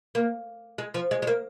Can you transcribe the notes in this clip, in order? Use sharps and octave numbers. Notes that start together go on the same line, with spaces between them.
A#3
G#3
F3
G#3
G#3
A#3